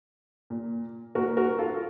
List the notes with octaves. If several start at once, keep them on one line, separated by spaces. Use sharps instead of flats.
A#2
A#2 F#4 A#4
F#4 A#4
F4 A4